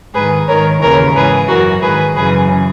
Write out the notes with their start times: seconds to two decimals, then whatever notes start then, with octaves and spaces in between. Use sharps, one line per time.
0.14 G#2 D#3 G#4 B4
0.48 G#2 D#3 A#4 C#5
0.81 D#2 C#3 E3 A#4 C#5
1.15 G#2 E3 G#4 B4
1.48 F#2 E3 F#4 A#4
1.82 G#2 D#3 G#4 B4
2.16 F#2 C#3 E3 G#4 B4